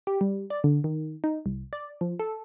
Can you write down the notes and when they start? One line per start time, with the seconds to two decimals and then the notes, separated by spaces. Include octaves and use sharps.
0.07 G4
0.21 G3
0.50 D5
0.64 D3
0.84 D#3
1.24 D#4
1.46 C2
1.73 D5
2.01 F3
2.19 A4